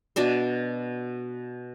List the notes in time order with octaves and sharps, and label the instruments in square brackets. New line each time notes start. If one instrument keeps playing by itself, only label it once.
[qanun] B2 D4 D5 E5